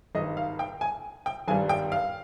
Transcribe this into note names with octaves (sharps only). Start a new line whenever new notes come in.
G#1 G2 D#3 D#5
F5
G5
G#5
G5
G#1 G2 G3 G#5
G5
F5